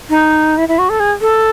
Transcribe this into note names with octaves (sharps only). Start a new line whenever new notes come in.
D#4
E4
E4
F#4
A4
G#4
A4